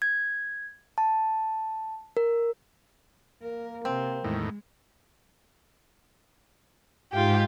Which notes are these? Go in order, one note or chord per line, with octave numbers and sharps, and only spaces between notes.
G#6
A5
A#4
A#3 A#4
C3 C4
E2 A2 D#3 G#3
G#2 F4 G4